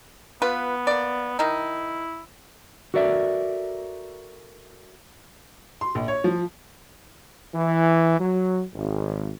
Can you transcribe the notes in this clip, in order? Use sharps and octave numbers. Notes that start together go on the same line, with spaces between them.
B3 F4 B4
A#3 D5
D#3 D#4 E4
F#4 A4 A#4 D5 E5
C6
A#1
C#5
F3
E3
F#3
G#1